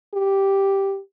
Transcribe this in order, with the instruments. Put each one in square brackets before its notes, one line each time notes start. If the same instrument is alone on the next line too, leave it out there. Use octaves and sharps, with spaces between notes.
[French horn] G4